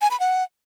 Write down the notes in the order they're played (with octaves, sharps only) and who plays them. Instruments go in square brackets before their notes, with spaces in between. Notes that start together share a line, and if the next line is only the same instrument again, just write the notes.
[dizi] G#5
B5
F#5